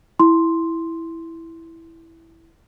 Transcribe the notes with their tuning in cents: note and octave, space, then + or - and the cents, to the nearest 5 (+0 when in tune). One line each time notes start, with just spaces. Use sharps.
E4 +0 C6 +0